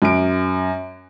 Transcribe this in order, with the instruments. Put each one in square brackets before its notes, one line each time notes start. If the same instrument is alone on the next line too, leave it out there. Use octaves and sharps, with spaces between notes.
[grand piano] F#2 D7